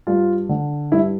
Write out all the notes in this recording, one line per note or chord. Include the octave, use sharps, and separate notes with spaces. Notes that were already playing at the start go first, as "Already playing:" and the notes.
G2 F4
D3
G2 E4